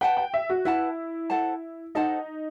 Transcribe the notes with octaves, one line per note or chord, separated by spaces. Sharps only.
B4 F#5 G5 A5
G5
E5
F#4
E4 B4 F#5 A5
A4 C5 F#5 A5
D#4 A4 C5 F#5 A5